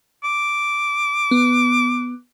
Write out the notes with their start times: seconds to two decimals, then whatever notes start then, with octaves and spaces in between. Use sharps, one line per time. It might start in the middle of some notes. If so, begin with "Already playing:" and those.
0.24 D6
1.31 B3